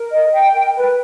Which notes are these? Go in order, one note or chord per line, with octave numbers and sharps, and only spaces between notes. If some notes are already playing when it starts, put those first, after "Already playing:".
Already playing: A#4
D#5
G5
A#4
B4